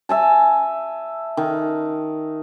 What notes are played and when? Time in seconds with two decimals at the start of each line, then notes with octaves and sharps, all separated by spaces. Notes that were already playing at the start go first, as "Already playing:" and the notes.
0.09 E5 G#5 A5
1.37 D#3